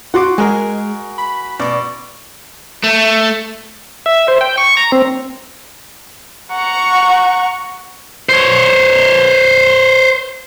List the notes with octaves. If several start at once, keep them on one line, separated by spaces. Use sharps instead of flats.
F#4 F#5 C6 D6
G#3 G#4 A#4
B5
B2 D5
A3
E5
C5
G5
C#6
A#5
C4
F#5 A#5 C#6
C5 C#5